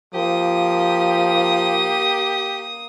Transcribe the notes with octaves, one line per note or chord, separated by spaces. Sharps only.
F3 A#3 G4 D#6